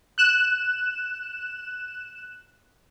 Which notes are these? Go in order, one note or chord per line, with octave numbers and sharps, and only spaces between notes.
F#6 E7